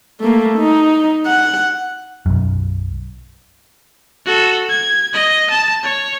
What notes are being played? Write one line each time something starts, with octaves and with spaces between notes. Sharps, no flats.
A3 A#3
D#4
F#5
B1 F#2
F#4 A4
G#6
D#5
A5
C#5